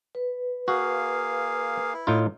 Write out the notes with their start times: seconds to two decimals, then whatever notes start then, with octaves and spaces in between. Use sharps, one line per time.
0.15 B4
0.68 A#3 F#4 G#4 F5
1.94 E4
2.07 A2 D#4 F4